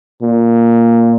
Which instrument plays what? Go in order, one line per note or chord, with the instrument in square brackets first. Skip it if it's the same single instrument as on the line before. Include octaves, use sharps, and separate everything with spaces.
[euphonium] A#2